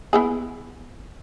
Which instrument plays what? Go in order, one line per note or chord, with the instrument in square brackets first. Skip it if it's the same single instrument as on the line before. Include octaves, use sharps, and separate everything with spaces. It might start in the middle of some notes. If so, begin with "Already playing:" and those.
[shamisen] B3 E4 G#4